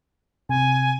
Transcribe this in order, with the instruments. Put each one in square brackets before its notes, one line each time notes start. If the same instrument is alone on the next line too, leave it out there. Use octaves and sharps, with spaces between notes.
[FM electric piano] C3 [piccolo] G#5